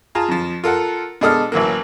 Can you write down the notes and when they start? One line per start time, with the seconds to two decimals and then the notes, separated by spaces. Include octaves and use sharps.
0.15 F4 G#4 A5 A#5
0.28 F2 F3
0.64 F4 A4 A#4 F#5
1.21 B2 G#3 D4 A4 D#6 F6
1.52 A1 E3 F#3 A#3